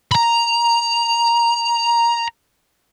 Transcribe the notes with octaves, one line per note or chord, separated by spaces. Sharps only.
A#5 B5